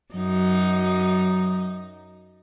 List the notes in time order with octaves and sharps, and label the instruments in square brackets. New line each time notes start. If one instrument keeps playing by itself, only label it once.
[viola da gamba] F#2 D#4 [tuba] F#3